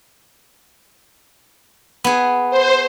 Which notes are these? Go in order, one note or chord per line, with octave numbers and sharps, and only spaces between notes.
B3 G#4
C5